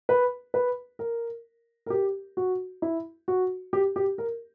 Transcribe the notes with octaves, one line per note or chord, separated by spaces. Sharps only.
B4
B4
A#4
A#4
G4
F#4
E4
F#4
G4
G4
A#4